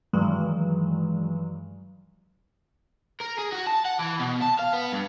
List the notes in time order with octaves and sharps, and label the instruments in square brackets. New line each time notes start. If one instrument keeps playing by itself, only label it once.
[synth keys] G2 D#3 E3 F#3 G#3
[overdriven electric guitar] A#4
G#4
F#4
A5
F#5
E3
B2
A5
F5
B3
G2